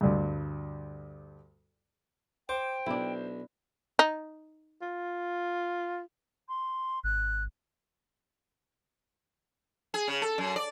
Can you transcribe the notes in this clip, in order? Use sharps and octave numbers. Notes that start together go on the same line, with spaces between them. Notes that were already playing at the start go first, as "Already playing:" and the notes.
D2 G2
C5 G5 D6
B1 D4 E4
D#4
F4
C6
G#1 F#6
G#4
C#3
A4
F#2
D5